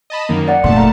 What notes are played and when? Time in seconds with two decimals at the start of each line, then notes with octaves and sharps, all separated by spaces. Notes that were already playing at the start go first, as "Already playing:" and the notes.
0.10 D#5 A5 B5
0.29 F#2 D#3 A#3
0.48 D5 F#5
0.64 F1 A#2 A3 A5 C6
0.76 F5 A#5